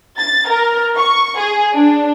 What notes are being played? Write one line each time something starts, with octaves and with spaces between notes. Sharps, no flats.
A6
A#4
C#6
G#4
D4